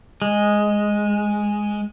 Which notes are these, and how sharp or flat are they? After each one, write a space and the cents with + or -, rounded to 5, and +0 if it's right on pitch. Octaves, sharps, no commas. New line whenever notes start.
G#3 +0